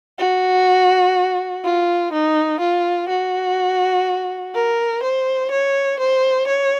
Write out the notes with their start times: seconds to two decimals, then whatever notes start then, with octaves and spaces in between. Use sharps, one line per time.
0.18 F#4
1.64 F4
2.12 D#4
2.60 F4
3.09 F#4
4.54 A#4
5.03 C5
5.51 C#5
5.99 C5
6.47 C#5